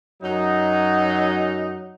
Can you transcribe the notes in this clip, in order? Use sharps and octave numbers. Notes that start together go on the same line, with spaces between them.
F#2 F#3 D#4